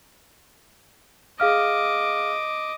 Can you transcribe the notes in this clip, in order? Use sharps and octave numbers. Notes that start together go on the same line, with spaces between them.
G#4 D#5 F5 D6 F6